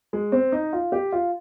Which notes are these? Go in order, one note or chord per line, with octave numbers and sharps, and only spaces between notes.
G#3
C4
D#4
F4
G4
F4